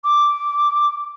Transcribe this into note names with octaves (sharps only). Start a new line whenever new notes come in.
D6